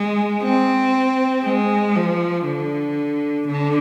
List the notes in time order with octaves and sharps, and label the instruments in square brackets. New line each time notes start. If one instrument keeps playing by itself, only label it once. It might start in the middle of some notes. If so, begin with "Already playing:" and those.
Already playing: [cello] G#3
C4
G#3
F3
D3
D3